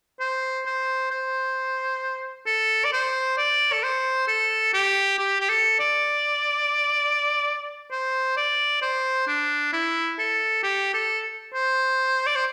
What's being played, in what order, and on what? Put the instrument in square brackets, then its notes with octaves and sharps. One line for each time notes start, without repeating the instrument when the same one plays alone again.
[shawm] C5
C5
C5
A4
D5
C5
D5
A4
C5
A4
G4
G4
G4
A4
D5
C5
D5
C5
D4
E4
A4
G4
A4
C5
D5
C5